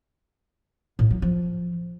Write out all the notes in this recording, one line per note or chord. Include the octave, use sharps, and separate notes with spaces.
A2
F#3
F3